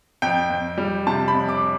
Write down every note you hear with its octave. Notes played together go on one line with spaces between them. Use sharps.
F2 G5
F2
G3
C3 A5
B5
F2
D6